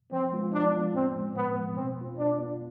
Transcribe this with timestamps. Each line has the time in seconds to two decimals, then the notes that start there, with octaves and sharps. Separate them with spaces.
0.12 F3 C4
0.32 G#3 B3 F4
0.53 F3 D4
0.73 G#3 B3 F4
0.94 A2 C4
1.15 F3 G#3
1.35 A2 B3
1.55 F3 G#3
1.76 B2 C4
1.97 B3 F4
2.17 B2 D4
2.39 B3 F4